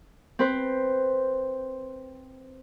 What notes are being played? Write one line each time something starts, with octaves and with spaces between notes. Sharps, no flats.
C4 B4 C5